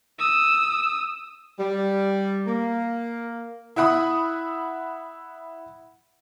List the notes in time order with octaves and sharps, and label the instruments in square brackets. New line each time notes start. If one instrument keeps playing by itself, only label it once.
[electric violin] D#6 E6
[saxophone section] G3
A#3
[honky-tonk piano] E4 E5 F#5 B5 D#6